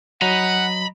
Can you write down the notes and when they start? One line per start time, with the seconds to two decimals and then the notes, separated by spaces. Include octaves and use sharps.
0.22 F#3 D#5 F#5 A#5 B5